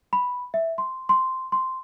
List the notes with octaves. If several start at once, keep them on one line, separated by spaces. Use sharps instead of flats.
B5
E5
C6
C6
C6